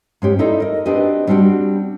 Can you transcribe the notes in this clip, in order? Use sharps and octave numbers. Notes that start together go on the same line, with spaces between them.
G#2 C#4 G4
D#4 E4 A4 C5 D5 D#5
A#4 D#5
C4 D4 F#4 G4 B4 D#5
G3 C4 D4 F#4 G4